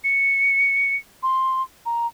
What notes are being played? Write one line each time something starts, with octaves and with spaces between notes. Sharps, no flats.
C#7
C6
A#5